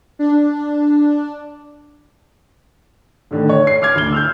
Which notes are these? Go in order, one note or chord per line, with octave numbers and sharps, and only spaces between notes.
D4
A2 D3 D#3
C#5
C7
D6 F6 G#6
D2 G7
E6 F6 G6